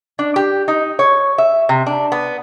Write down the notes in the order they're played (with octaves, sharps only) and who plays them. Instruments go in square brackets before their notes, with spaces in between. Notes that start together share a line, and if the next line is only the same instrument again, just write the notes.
[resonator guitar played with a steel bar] D4
G4
D#4
C#5
E5
C3
D4
B3